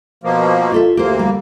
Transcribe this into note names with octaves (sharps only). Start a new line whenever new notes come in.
B2 F3 A#3
F4 A4 E5
D2 A#3 G4 C5
G3